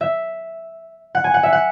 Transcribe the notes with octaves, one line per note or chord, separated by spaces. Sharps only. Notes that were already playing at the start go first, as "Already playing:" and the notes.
E5
F#5
G#5
F#5
E5
F#5